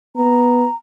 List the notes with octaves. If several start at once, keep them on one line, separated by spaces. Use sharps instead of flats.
B3 A#5